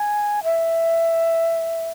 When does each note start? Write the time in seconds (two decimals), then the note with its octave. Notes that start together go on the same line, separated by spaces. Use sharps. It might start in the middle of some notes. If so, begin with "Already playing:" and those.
Already playing: G#5
0.44 E5